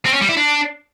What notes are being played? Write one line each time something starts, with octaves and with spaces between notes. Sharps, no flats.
C4
C#4
G3
E4
D4